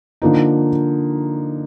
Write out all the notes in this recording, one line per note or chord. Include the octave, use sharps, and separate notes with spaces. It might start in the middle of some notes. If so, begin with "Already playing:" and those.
D3 F3 A#3 D#4